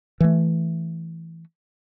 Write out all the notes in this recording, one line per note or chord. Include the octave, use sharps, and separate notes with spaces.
E3 A3